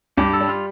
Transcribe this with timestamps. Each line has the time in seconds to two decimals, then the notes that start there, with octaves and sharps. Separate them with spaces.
0.17 G2 G4
0.33 A4
0.40 G3
0.49 F4